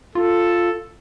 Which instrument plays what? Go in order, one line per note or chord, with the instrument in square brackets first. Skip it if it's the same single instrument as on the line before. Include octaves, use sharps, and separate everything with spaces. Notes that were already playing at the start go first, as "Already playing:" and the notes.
[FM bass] F4 [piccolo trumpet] A4